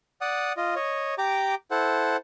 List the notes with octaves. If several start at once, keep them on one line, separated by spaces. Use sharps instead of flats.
D5 F#5 D#6
F4 D#5
C#5 D#5
G4 G5 A#5 D6
E4 A4 C5 F#5